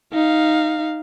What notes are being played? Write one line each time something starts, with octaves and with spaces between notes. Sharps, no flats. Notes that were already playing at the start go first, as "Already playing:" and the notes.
D#4 F5